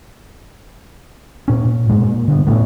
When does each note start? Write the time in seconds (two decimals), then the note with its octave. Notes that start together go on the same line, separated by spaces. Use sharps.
1.48 A#2 C#4
1.65 A#2
1.89 G#2 G#3
2.01 A#2
2.28 D3 G3 B3
2.47 A1 A2 A3 B3